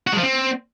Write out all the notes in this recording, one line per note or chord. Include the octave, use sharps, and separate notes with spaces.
F#4
G#3
F3
C4